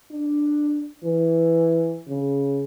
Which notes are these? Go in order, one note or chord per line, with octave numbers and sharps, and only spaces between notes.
D4
E3
C#3